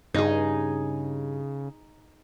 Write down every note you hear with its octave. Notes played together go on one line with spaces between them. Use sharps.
G2 C#3 D#4 G#4